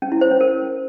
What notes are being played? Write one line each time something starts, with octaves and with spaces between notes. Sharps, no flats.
C#4
E4
C5
C#4
A#4